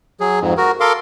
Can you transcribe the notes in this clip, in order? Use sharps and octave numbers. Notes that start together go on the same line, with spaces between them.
F#3 G#4
F2 G#2
F#4 A#4
A4 A#4 F5 C6 D6